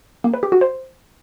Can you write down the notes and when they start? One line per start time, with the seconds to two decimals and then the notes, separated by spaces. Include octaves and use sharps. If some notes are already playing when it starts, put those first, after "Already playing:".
0.24 A#3
0.34 B4
0.43 G4
0.52 F#4
0.61 C5